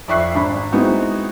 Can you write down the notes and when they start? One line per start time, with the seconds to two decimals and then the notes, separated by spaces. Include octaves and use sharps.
0.08 F2 D5 E5 C#6 F#6 C7
0.34 G#1 D4 B5
0.72 G#3 B3 C4 D#4 E4 F#4